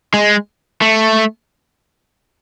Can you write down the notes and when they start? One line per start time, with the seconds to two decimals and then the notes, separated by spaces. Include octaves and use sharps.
0.14 G#3
0.82 A3